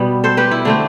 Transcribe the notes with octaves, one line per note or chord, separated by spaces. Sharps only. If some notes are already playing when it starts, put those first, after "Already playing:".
Already playing: B2 G3 B3
A4 C5
G4 B4
E4
D3 A3 C4 D4